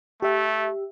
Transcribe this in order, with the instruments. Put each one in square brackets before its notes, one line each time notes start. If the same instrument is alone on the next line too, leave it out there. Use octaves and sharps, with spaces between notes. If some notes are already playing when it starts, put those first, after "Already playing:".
[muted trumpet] A3 [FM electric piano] G4 E5